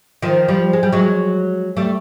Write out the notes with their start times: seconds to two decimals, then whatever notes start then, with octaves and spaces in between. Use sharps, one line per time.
0.22 D#3 F3
0.48 F3 G3
0.73 G#3
0.83 G3
0.92 F#3 G#3
1.77 G3 A3